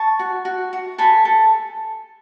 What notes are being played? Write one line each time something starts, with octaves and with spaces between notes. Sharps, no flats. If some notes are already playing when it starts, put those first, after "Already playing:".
Already playing: A5 C#6
F#4
F#4
F#4
A4 G#5 B5
A4